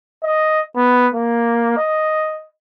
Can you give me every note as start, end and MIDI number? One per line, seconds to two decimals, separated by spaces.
0.23 0.61 75
0.76 1.07 59
1.15 1.76 58
1.77 2.46 75